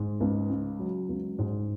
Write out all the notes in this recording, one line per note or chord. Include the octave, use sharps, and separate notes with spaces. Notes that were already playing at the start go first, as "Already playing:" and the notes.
Already playing: G#2
C#2
C#3
F#3
C#2
G#2